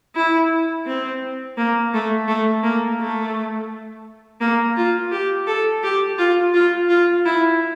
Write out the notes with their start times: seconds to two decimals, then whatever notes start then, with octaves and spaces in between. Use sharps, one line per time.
0.15 E4
0.87 C4
1.57 A#3
1.93 A3
2.28 A3
2.63 A#3
3.00 A3
4.41 A#3
4.77 F4
5.12 G4
5.47 A4
5.83 G4
6.18 F4
6.54 F4
6.89 F4
7.25 E4